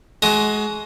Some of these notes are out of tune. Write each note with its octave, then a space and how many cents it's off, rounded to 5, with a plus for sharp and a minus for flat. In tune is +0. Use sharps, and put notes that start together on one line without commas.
G#3 +30 F#4 +25 D#6 +0